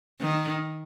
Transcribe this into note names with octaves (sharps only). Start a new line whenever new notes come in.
D#3